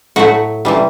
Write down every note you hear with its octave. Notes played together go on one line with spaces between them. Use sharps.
A2 F#3 A3 F#4
C3 E3 G3